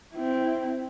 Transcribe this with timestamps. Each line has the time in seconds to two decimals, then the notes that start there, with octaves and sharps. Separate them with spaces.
0.14 C4 E4